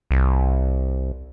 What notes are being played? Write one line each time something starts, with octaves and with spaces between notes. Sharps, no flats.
C2